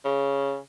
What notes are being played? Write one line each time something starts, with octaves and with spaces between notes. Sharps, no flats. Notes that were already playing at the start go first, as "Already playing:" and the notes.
C#3